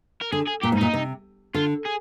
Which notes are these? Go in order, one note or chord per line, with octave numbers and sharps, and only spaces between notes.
A#4
D3 G#4
G#4
A#2 G4
G#2
A#2 D#4
C3
D3 F4
G#4